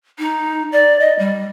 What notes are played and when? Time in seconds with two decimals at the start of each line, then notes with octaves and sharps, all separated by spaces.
0.19 D#4
0.72 D5
1.00 D#5
1.19 G3